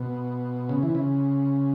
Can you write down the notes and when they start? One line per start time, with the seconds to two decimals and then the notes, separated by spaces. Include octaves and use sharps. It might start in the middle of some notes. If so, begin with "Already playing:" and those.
Already playing: B2
0.69 C#3
0.83 E3
0.95 C#3